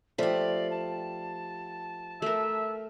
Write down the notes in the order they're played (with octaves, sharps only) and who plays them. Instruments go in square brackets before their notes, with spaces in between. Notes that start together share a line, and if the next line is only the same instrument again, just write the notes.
[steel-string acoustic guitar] F3 G4 [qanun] A3 B5 [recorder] D5
[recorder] A5
[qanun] A3 A#4 [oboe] E5